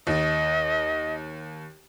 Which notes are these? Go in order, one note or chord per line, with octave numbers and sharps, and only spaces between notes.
D#2 D#5